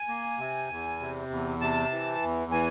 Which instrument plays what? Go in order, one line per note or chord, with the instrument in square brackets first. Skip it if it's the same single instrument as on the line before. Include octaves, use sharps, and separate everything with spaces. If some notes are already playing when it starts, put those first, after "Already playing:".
Already playing: [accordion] G#5
A#3
C3
E2
C3
E2
C3 A5
E3
E2
E3 G#5